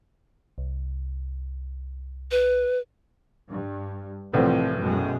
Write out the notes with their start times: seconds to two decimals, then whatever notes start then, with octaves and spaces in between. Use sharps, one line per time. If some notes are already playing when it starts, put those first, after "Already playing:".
0.58 C2
2.31 B4
3.50 G2
4.33 C2 A2 E3 F3 C4
4.79 F#2 B2 G#3